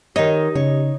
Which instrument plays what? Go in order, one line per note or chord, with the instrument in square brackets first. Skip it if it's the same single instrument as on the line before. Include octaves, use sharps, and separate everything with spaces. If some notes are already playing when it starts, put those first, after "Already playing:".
[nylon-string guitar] D#3 C#5 [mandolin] D#4 [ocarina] G4
[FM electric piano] C#3 [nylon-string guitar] C#5